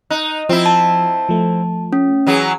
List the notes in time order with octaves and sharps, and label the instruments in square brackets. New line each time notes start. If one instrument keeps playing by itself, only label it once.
[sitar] D#4 [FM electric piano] F#6
[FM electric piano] F3 [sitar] C4 E4
[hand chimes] A5
[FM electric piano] F3 A3
[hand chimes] C#4
[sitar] E3 F#3 G#4